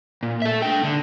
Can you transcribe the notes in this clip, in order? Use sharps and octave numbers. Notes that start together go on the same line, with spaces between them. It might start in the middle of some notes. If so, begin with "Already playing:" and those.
A#2
A4 E5
D4 G5
D3